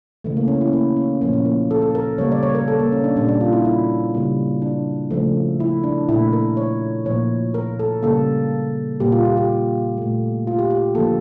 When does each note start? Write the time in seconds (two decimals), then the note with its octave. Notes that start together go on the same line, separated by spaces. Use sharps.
0.24 C#3 E3 A3
0.37 A#3
0.48 C#4
0.61 E4
0.67 C#4
0.73 A#3
0.96 C#4
1.21 A#2 F3 A#3 C#4
1.33 C#4
1.45 A#3
1.71 A4
1.82 A4
1.95 A#4
2.18 C#3 G3 A#3 C#5
2.32 D5
2.43 C#5
2.55 A#4
2.68 A4
2.79 A#3
2.92 C#4
3.04 D4
3.16 A#2 G3 A#3 D4
3.28 D4
3.41 F4
3.53 E4
3.65 E4
4.14 C#3 G3 A#3
4.62 D4
5.11 C#3 F3 A3
5.60 E4
5.83 D4
6.09 A#2 A3 E4
6.33 A#4
6.57 C#5
7.05 A#2 F3 A#3 C#5
7.54 A#4
7.79 A4
8.03 C#3 G3 A#3 A4
9.00 A#2 G3 A#3 G4
9.12 F4
9.25 G4
9.37 G4
9.98 A#2 A3
10.47 F4
10.59 G4
10.70 G4
10.95 D3 F3 A#3 A4